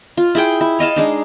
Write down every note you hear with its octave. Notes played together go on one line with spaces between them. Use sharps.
F4
E4 G#4 G5
E4
C#5 D#5 F5 A5
G#3 D4 D#4